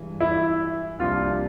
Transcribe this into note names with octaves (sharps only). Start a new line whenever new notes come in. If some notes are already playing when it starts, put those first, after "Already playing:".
Already playing: G2 E3 G#3
E4
C2 C3 F3 A#3 D4 F4